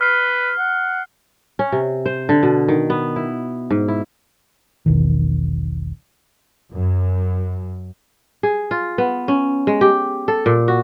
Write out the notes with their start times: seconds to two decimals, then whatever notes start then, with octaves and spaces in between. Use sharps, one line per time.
0.01 B4 F6 C7
0.58 F#5
1.59 C#4
1.72 C3
2.06 C5
2.29 D3
2.43 B2
2.68 D#3
2.90 B3
3.16 E4
3.71 G#2
3.88 E4
4.86 E1 B1 D#3
6.70 F#2
8.43 G#4
8.71 F4
8.98 B3
9.28 C#4
9.67 G#3
9.81 G4
10.28 A4
10.46 A#2
10.68 F#4